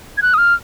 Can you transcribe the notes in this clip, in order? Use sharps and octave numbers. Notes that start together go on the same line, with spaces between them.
G#6
F#6
D#6
F6